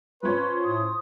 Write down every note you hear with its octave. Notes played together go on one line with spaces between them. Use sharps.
F3 C#4 B4 C5
A2 D#6